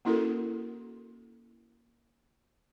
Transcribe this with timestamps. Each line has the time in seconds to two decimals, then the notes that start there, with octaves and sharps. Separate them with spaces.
0.05 A#3 C#4 E4 F#4 A4 A#4